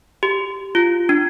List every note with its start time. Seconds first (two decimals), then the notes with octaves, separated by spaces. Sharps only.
0.23 G4
0.75 F4
1.09 D4